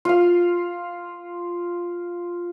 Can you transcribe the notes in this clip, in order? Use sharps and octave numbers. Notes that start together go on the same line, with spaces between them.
F4 F5